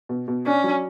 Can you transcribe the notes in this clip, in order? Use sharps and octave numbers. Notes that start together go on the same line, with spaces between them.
B2
B2
C#4 D4
F#3